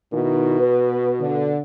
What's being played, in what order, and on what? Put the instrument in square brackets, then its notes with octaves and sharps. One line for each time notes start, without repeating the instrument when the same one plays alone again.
[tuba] B2 [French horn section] D#3 E4
[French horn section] B4
D3